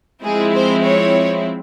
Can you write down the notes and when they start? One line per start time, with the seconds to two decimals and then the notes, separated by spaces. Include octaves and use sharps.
0.23 F3 G#3 C4 E4 G#4
0.54 C5
0.84 C#5